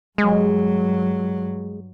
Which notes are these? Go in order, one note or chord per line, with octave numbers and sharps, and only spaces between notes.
G2 F#3 G#3